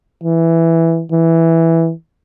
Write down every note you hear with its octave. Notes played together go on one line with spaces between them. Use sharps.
E3
E3